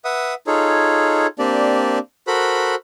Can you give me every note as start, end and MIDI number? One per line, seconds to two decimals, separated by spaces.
0.05 0.34 71
0.05 0.34 76
0.05 0.34 78
0.05 0.34 87
0.47 1.27 63
0.47 1.27 65
0.47 1.27 68
0.47 1.27 69
0.47 1.27 73
1.39 1.99 58
1.39 1.99 60
1.39 1.99 62
1.39 1.99 67
1.39 1.99 74
2.27 2.75 66
2.27 2.75 69
2.27 2.75 70
2.27 2.75 72
2.27 2.75 83
2.27 2.75 90